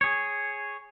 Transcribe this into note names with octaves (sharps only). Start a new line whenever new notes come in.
G#4 C#5